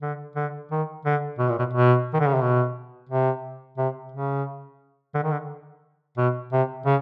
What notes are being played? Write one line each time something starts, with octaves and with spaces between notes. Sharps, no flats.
D3
D3
D#3
D3
B2
A#2
B2
B2
D#3
D3
C#3
C3
B2
C3
C3
C#3
D3
D#3
D3
B2
C3
C#3